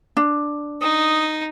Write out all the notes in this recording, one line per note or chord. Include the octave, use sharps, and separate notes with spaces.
D4
D#4 D#6